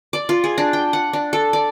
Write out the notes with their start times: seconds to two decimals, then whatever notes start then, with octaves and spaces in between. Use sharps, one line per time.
0.13 D5
0.29 F4
0.44 G#4
0.58 D4
0.73 G5
0.93 F#5
1.13 D4
1.33 A4
1.53 D5